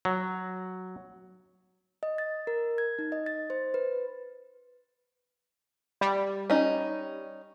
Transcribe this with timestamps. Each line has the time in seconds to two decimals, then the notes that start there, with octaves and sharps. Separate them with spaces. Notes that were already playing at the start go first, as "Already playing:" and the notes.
0.05 F#3
2.03 D#5
2.18 A6
2.47 A#4
2.78 G#6
2.99 D#4
3.12 D#5
3.26 A6
3.50 C5
3.74 B4
6.01 G3
6.50 C#4 D#4